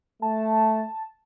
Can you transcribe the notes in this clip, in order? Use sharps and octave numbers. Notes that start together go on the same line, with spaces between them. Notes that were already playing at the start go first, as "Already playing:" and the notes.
A3 A5